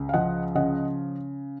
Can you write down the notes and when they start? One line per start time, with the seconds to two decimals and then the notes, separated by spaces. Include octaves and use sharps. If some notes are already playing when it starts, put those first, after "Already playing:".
Already playing: C#2
0.09 F5
0.14 F3 D#5 F#5
0.55 C#3 D#5 F#5